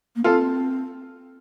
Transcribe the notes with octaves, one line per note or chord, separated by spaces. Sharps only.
A#3
C4 F4 A4